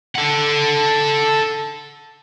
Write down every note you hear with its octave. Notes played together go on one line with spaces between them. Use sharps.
A4 F#5